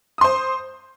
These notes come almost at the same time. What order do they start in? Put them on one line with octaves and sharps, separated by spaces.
D#6 C6 C5